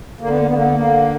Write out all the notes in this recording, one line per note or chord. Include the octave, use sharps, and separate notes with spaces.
D3 A#3
B3
A#3
B3
D3 A#3
B3
A#3
D3